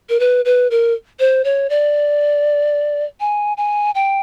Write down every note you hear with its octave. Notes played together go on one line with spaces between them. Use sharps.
A#4
B4
B4
A#4
C5
C#5
D5
G#5
G#5
G5